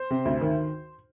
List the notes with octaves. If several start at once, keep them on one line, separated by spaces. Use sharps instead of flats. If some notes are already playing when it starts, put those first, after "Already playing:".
Already playing: C5
C3
D2
D#3